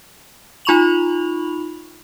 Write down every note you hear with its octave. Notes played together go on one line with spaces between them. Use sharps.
D#4 F4 B5 C#6 F7 F#7